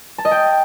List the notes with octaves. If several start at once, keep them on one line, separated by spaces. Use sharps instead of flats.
A5
D#5
G5